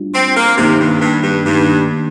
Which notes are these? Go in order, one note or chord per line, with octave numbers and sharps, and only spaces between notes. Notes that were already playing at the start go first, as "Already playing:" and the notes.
Already playing: G3 D4 F4
C4
A#3
C3 D#3 A#3 D#4
G2
G2
G2
G2 D#3 A#3 D#4